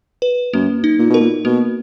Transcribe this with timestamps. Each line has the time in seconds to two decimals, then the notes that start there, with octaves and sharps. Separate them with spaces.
0.22 B4
0.53 F#2 A#3
0.84 D#4
0.99 A#2
1.10 B2 A#4
1.20 A#2
1.45 B2 A#3